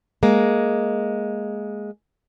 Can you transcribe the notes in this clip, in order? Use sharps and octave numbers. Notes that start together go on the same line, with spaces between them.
G#3 A#3